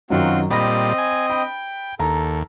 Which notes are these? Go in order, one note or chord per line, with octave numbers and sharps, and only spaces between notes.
F#2 D#3 F#3 C4 F4 F#4
A#2 G3 C4 D#5 B5 A#6
G#5
G5 B5
D#2 A4 A#5